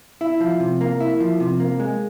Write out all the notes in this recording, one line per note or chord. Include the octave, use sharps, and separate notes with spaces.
E4
F3
C3
A#3
E4
F3
C3
A#3
G#3